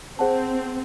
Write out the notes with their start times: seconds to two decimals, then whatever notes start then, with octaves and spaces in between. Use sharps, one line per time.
0.19 C4 G#4 C5 F#5 A5